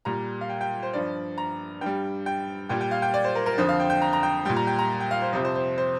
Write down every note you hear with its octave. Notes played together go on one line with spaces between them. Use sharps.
A#2 G3 A#5
F5
G5
G5
C5
G2 F3 D5
A#5
G2 G3 G5
G5
A#2 G3 G5
G5
F5
G5
D5
C5
A#4
A#4
F2 D3 F3 C5
F5
G5
G5
A#5
A#5
G5
A#2 G3 G5
A#5
G5
A#5
G5
F5
C5
F2 C3 F3 C5
C5
C5
C5